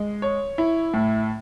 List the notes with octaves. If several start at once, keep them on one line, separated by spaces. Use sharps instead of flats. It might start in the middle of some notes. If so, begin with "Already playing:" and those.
Already playing: G#3
C#5
E4
A2